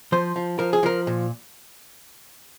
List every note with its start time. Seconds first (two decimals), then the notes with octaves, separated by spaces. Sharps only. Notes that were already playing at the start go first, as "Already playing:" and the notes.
0.12 F3 C5
0.36 F3
0.59 F3 A#4
0.73 G#4
0.83 F3 A#4
1.07 A#2